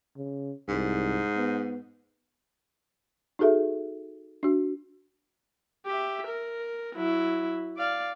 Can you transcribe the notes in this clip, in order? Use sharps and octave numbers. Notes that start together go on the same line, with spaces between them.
C#3
C2 G#2
B3
D#4 F#4 G#4 A4 E5
D4 F#4
G4 E5
A#4
F#3 E4
D5 F5